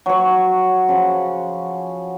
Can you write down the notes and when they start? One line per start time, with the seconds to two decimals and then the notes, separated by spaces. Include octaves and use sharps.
0.06 F#3 C#5
0.88 C#3 F3 F#5